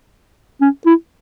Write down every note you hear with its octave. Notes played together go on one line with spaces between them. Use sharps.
C#4
E4